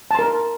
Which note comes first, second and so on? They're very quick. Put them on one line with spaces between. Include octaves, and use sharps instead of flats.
A5 C6 A#4